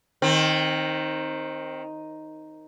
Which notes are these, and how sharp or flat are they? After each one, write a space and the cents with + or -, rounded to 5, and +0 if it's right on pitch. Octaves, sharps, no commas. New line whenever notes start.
D#3 +0 C4 +25